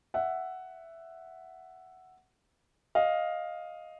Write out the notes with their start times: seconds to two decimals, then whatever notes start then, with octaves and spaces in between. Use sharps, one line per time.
0.14 E5 F#5
2.95 D#5 F5